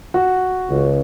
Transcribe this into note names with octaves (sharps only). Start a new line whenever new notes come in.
F#4
C#2